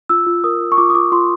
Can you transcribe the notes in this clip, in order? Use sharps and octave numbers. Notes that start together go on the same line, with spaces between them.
F4 E6
F4
A#4 D#6
F4
C#6
F4 D6
D#6
F4 D6
F4 C6